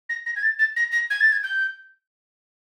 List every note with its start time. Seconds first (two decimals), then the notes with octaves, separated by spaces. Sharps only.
0.09 A#6
0.26 A#6
0.36 G#6
0.43 A6
0.59 A6
0.76 A#6
0.92 A#6
1.10 G#6
1.21 A6
1.32 G#6
1.44 G6